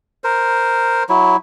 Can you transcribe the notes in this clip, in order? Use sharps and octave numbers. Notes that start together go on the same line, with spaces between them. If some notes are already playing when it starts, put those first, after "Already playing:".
A#4 C5
F#3 E4